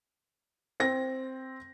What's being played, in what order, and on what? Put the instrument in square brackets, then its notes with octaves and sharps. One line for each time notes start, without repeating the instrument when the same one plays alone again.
[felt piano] C4 A#6